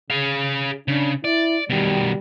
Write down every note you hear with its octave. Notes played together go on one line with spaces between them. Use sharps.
C#3 G#4 F5
C#3 D4
E4 D5
B2 D#3 G3